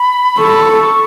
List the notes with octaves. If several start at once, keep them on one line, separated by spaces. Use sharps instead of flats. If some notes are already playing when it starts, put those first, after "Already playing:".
Already playing: B5
A4 C#6
B5
C#6